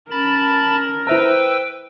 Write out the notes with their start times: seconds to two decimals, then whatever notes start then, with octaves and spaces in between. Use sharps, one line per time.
0.11 C#4 A#4 A5 B5 A6
1.07 E4 B4 C5 E5 G5 A#5 E6